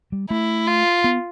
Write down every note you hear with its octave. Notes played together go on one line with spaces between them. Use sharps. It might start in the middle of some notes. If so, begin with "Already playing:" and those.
G3
A3 E4
F4
B3